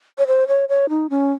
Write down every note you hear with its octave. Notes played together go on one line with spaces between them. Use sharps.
C#5
C5
C#5
C#5
D#4
C#4